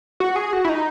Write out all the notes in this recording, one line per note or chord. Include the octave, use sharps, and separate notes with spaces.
F#4
G#4
F#4
E4
D#4